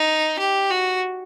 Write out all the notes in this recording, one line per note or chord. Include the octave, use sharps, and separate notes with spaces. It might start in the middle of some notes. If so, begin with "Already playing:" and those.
Already playing: D#4
G4
F#4